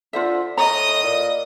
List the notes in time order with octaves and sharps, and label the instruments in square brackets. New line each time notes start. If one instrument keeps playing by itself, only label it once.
[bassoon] D3 [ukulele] F4 C5 E5
[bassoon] A2 [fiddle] D#5 D#6 [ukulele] A#5
[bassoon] A#2